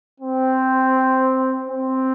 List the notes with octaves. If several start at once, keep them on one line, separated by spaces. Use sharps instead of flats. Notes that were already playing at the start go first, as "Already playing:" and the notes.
C4
C4